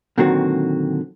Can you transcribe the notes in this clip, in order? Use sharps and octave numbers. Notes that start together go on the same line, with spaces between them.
A#2 D3 D#3 F#3 C4 F#4